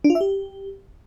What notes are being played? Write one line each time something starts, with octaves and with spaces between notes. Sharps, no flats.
D4
F4
E5
G4